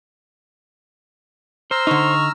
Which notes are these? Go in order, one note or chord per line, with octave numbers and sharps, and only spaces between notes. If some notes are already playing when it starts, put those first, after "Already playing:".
C5 A#5 E6 F6
D3 D#4 C#6